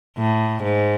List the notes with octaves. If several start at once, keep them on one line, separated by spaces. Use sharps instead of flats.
A2
G#2